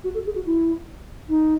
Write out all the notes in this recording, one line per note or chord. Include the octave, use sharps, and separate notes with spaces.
F#4
A4
G#4
F#4
E4
D#4